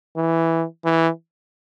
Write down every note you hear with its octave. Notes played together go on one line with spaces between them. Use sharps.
E3
E3